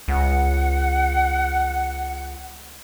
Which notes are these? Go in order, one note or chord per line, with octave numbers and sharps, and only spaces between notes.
C#2 F#5